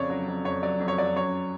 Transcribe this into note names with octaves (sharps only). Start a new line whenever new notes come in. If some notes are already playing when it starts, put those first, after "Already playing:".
Already playing: F2 C#3 C#5 D5
F#3
F2
F2 C#5
F#3 D5
F2
C#5
F#3 D5
F#2 C#5